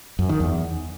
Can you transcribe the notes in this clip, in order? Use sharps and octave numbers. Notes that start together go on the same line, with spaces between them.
F#2
D#3
E2